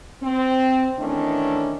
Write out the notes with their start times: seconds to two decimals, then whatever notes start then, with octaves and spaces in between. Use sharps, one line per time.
0.22 C4
0.98 D#3 E3 A3 C#4 D4